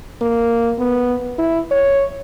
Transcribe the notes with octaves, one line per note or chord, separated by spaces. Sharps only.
A#3
B3
E4
C#5